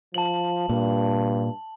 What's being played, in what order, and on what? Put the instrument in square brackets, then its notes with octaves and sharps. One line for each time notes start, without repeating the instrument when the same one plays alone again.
[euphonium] F3 [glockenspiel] A5 F#7
[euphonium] G2 [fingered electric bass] A#2